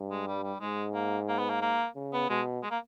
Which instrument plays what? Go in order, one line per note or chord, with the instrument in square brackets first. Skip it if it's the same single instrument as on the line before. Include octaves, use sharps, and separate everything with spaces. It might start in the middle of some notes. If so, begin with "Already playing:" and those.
Already playing: [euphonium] G2
[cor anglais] G#3
G3
G3
[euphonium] G#2 [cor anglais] G#3
[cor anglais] A#3
A#3
B3
A#3
A#3
[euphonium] C#3
[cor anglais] B3
[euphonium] B2 [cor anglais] G#3
[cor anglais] G#3
A#3